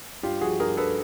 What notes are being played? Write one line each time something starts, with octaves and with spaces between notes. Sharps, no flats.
G2 F4 G4
F3 F#4 G#4
G2 G#4 A#4
G2 A4 B4